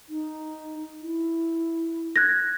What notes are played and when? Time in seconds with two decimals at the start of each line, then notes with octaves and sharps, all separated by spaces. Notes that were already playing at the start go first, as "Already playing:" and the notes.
0.09 D#4
1.01 E4
2.16 F#6 G#6 A#6